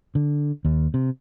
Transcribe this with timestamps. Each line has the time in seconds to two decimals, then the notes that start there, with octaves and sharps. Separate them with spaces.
0.15 D3
0.65 D#2
0.94 C3